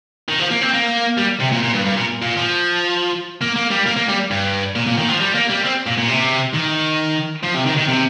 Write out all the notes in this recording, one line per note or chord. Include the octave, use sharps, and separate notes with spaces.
D#3
F3
A#3
C4
A#3
G3
C3
A#2
A#2
G2
G2
A#2
A#2
F3
A#3
A#3
G3
A#3
A#3
G3
G2
A#2
A#2
D#3
F3
G3
A#3
G3
C4
A#2
A#2
C3
D#3
F3
C3
D#3
D#3
C3